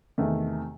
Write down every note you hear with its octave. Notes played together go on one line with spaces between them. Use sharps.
E2 C3 D#3 A3